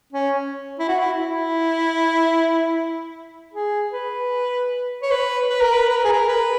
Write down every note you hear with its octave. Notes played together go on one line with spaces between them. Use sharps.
C#4
E4
F#4
E4
E4
G#4
B4
C#5
B4
B4
A#4
B4
B4
A#4
G#4
A#4
B4